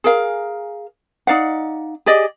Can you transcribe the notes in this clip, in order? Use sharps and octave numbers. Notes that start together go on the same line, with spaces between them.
G#4 A#4 F5
D#4 D5 F5 F#5
G4 G#4 D5 D#5